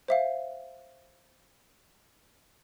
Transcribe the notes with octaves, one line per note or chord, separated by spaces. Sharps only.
C5 E5 F5